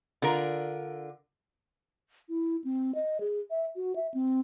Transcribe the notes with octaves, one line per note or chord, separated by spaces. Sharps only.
D3 F4 A#4 D5
E4
C4
D#5
G#4
E5
F#4
E5
C4